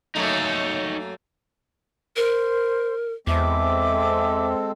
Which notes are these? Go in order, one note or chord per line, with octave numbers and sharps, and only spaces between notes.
F#2 A3 A#3 D#4 C#5
A#4 C5
E2 G#3 C4 A4 E5 D6